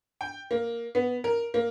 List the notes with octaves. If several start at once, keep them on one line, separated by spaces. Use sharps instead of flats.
G5
A#3
B3
A#4
A#3